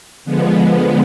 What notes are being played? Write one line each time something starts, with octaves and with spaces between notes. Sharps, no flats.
D3 F3 G#3 B3